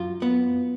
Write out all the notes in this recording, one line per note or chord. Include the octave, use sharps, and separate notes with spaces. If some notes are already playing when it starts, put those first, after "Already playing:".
Already playing: F#2 F4
B3